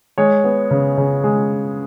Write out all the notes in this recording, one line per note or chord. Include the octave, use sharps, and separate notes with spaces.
G#3 C#5
B3
C#3
C#3
G#3